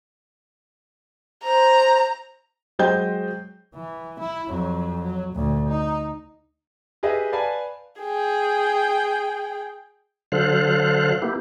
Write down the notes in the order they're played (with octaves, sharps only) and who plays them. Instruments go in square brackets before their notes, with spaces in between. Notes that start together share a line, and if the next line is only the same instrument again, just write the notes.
[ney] C5 [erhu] A#5
[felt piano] F#3 G#3 C5 D#5 G5 G6
[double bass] E3
E4
F2 F#3
F#3
D2 A#2
D#4
[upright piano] G4 G#4 B4 D#5 E5
B4 D5 F5 G#5 A5 B5
[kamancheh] G#4 G5
[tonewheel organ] D3 F#3 A4 C5 F5 F#6
A#3 B3 E4 G4